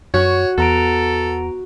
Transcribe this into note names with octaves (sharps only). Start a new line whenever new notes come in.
F#2 F#4 C#5
E2 B3 A4 A#5 D7